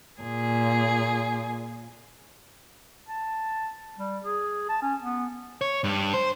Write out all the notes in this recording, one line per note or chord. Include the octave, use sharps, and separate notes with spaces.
A#2 G#4
A5
G3
G#4
A5
C#4
B3
C#5
G2
C5